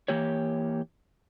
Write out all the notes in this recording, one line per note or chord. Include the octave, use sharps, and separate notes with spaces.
E3 A#3 G4 C#5